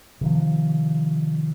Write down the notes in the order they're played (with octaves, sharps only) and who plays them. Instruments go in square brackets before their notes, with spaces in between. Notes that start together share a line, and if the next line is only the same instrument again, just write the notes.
[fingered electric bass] C3 D#3 F3